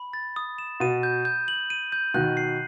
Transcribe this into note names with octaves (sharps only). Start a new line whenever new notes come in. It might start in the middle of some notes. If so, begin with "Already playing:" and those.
Already playing: B5
A6
D#6
E7
B2 D#7
G6
G6
F#7
D#7
G6
B2 D#3 F#6
C7